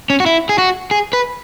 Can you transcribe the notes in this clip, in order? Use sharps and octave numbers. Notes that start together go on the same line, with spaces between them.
C#4
F#4
E4
G#4
F#4
G#4
B4